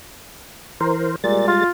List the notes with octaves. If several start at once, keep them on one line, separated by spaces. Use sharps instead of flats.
E3 A#4 C5
A#2 G3 G#3 A6
F4